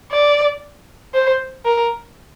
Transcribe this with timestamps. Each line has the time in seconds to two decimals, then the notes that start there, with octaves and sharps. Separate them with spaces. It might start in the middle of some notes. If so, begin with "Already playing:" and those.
0.12 D5
1.14 C5
1.65 A#4